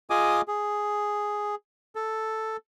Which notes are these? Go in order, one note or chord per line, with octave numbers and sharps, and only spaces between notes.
F4 G#4 D#5 G#5 D6 D#6
G#4
A4